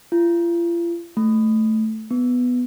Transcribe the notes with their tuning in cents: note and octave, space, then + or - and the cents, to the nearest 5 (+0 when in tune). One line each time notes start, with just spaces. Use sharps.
F4 -40
A3 -5
B3 +5